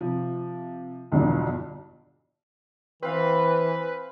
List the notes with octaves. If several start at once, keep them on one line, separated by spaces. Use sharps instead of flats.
C3 F3
B1 E2 G2 D3 E3 F3
E3 C4 B4 F5